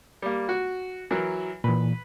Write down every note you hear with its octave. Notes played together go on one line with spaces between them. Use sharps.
G3 A#3
F#4
E3 F#3 A#4
A#2 E3 B4